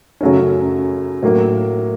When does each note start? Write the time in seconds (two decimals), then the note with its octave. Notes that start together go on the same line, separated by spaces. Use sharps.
0.21 F#2 C#3 F#3 A3 C#4
1.23 A2 F#3 A#3